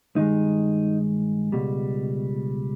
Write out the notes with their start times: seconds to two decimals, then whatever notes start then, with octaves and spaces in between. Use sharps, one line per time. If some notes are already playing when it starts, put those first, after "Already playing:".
0.16 G2 D#3 G#3 D#4
1.52 C#2 B2 G3